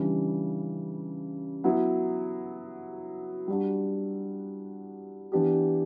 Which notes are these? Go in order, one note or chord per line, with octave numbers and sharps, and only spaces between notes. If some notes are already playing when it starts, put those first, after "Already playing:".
Already playing: C#3 E3 G3 D4
F#3 B3 E4
G3 D4 F#4
E3 B3 D4 G4